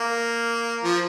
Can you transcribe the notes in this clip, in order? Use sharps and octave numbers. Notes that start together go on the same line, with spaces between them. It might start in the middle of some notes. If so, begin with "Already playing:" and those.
Already playing: A#3
F3